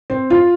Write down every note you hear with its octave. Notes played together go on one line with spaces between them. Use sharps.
C4
F4